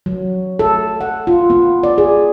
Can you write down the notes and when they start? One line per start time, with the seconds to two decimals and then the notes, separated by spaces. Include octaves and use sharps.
0.06 F#3
0.59 A4
1.01 F#5
1.27 F4
1.50 B3
1.83 D5
1.98 G#4